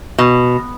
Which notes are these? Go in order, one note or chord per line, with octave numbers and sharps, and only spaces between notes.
B2